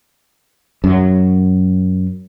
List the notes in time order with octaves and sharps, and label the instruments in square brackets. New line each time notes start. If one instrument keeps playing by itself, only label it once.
[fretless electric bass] F#2 F#3